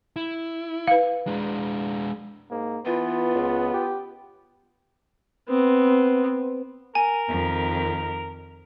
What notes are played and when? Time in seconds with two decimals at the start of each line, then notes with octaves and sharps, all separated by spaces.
0.16 E4
0.87 B4 F5
1.27 G#3 D4
2.51 G#2 A#3
2.86 E3 B3 F4
3.35 C#2
3.73 G4
5.48 B3 C4
6.95 A#4 G#5
7.29 F2 D#3